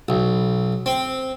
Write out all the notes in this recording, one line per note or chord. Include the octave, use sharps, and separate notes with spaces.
B1
C4